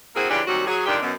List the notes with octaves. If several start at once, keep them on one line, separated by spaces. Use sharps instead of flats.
A#3 C4 E4 F#4 G#4
C#3 E3 C#4 D4 F4 G4
D#2 D#3 F#3 G3 C4 F#4
F#3 G#4
D3 D#3 G3 D4 F4 G4
F#2 B2